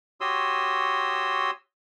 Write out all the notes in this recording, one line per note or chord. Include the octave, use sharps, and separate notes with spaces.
F#4 G4 C#5 C6 D#6 E6